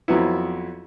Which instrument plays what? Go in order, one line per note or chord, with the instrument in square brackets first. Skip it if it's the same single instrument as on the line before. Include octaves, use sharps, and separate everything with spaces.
[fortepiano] F2 F#3 B3 E4